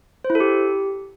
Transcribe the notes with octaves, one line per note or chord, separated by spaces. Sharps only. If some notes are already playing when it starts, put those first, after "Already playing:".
C5
E4
A4
G4